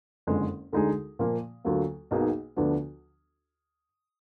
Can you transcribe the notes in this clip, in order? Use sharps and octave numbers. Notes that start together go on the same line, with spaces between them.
F#1 F2 D3 G#3
D2 D3 G#3 D#4 G#4
A#2 F3 A#3 F4
D2 D3 F#3 A#3 F4
B1 B2 A#3 D#4 G#4
D2 D3 F3 B3 D4